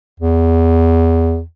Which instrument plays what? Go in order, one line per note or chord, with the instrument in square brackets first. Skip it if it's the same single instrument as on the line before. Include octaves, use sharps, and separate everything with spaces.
[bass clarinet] E2